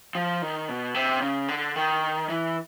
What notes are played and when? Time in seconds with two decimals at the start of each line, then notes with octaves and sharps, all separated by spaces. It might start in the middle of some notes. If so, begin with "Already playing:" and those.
0.15 F3
0.42 D#3
0.69 B2
0.94 C3
1.21 C#3
1.48 D3
1.76 D#3
2.29 E3